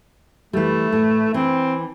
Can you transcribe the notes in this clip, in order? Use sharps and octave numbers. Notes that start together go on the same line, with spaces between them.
E3 G3 A3
A2
E3 C4 D4